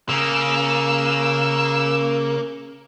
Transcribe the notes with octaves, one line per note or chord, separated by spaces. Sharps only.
C#3 A#3 E6